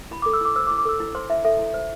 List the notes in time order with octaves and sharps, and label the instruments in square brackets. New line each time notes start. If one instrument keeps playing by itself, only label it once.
[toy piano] E4 B5
D6
A4
E6
E4 D6
C5 E6
D6
E4
D6
A4 E6
E4
C5 C6
E4 E5
A4 E5
E4
C5